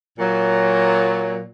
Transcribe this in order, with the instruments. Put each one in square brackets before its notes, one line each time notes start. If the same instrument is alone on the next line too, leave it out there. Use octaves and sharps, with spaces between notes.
[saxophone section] A#2 F#3